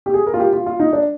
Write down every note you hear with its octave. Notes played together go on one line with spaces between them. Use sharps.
G4
G#4
A#4
F4
G4
F4
F4
D#4
D4